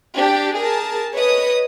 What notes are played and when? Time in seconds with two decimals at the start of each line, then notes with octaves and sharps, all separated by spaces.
0.16 D4 G4
0.56 G#4 A#4 A5
1.14 B4 C#5 D#5 D#6